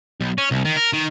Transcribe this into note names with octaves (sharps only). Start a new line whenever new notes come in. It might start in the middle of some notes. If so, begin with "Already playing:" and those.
B1
C#4
C2
D#3
A#4
D#3